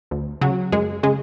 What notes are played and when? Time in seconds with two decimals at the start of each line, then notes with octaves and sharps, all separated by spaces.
0.11 D2
0.41 C#3 F#3 F#4
0.72 F#2 G#3 G#4
1.03 C#3 G#3 G#4